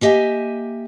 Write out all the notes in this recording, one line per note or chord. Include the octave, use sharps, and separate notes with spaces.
A#3 G4 D#5 E5 G#5